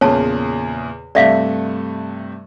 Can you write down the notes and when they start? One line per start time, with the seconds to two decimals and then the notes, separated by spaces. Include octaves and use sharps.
0.01 E2 A#2 C#3 C#5 A5
1.15 G2 C3 A3 D5 E5 F5